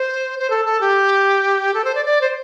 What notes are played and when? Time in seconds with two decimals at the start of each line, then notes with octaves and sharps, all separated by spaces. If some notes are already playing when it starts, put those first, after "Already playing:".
Already playing: C5
0.39 C5
0.50 A4
0.66 A4
0.81 G4
1.74 A4
1.84 C5
1.95 D5
2.05 D5
2.21 C5